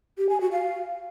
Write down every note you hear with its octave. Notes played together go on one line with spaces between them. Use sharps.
G4
G#5
F#4
F5